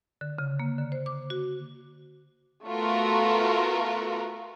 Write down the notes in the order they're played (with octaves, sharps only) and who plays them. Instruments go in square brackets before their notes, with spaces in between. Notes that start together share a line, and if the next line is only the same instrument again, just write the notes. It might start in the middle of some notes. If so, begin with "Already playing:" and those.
[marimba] D3
C#3
A#3
D3
C5
D6
F#4
[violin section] A3 B3 F4 F#4 A#4